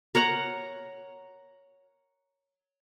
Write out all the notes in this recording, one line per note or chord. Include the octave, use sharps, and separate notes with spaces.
A#4 C#5 F#5 A#5